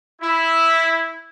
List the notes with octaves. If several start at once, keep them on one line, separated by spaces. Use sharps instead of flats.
E4